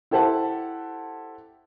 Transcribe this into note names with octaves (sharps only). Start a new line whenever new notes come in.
E4 G4 A4 C5 F#5 A5